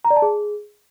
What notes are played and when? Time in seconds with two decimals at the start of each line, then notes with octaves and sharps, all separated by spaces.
0.05 A#5
0.10 D5
0.16 A5
0.22 G#4